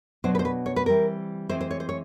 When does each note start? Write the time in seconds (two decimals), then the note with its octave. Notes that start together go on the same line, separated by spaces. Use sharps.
0.24 B2 F#3 B3 D4 C5
0.35 B4
0.39 C5
0.45 B4
0.66 C#5
0.76 B4
0.86 E3 G3 C4 A#4
1.49 E3 G#3 C4 C5
1.61 C5
1.71 C#5
1.80 C5
1.89 C#5